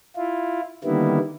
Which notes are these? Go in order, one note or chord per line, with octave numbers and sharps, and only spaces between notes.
E4 F4
D3 D#3 G3 A#3 B3 E4